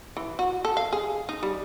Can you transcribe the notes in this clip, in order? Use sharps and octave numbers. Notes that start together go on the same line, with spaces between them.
E3
F#4
A4
F5
G#4
D#4
G3